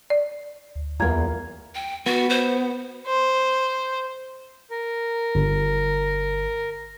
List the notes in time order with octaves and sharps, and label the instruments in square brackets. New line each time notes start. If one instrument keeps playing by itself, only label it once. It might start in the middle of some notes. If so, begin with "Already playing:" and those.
[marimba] D5
[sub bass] D2
[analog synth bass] E2 [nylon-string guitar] A#3 F4 [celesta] A#5 G#6
[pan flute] G5
[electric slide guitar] B3 [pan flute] F#4
[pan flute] C5
[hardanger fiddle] C5
[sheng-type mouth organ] A#4
[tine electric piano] G1